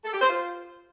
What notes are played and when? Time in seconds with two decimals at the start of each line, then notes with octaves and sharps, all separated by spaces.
0.04 A4
0.12 G4
0.21 C5
0.29 F4